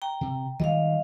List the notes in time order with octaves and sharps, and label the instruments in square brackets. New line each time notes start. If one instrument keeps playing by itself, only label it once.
[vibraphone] G5 A#5
[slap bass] C3
[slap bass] D#3 G3 G#3 [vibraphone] D#5 F5